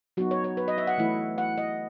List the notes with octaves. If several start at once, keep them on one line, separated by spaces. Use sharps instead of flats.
F#3 B3 D#4 F#4
C#5
C#5
B4
D#5
E5
F#5
E3 A3 E4
F#5
D#5